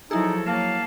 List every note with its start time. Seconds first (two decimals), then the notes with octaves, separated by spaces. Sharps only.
0.11 F3 F#3 D#4 E4 G#4 A4
0.47 F#3 A#3 F5 A5